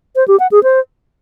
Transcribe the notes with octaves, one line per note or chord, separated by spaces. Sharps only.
C5
G4
F#5
G#4
C5